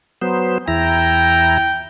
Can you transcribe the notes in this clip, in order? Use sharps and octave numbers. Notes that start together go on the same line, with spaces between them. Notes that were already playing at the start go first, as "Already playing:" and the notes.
F#3 B3 C5
E2 E4 G5 A#5